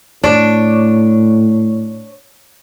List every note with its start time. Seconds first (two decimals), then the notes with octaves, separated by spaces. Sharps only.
0.24 A2 D4 C#5